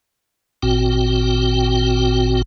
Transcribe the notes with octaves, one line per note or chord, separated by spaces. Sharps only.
G#1 A#2 C4 F#4 G5